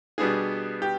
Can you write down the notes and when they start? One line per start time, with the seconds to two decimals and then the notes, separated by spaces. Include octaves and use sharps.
0.18 B2 G3 B3 D4 G#4
0.82 G4